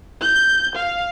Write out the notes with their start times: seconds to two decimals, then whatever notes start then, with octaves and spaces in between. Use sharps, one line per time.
0.21 G6
0.76 F5